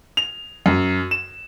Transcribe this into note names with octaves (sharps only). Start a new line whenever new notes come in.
F7
F#2
E7